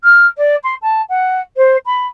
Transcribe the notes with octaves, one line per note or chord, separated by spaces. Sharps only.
F6
D5
C6
A5
F#5
C5
B5